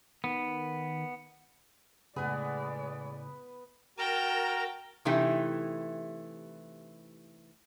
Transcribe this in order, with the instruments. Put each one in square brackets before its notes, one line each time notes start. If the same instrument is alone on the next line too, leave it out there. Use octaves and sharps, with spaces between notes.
[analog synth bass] D#3 [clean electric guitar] B3
[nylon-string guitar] A2 G#4 [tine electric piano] C#3 [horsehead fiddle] G#3 D5 [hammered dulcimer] B3 B4
[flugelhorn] F#4 [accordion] A#4 A#5 [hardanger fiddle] G5 A5
[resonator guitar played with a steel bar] C3 E3 A3 D#4 E4 G4